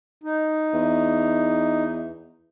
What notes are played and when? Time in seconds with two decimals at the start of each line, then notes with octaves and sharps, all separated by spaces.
0.23 D#4
0.73 E2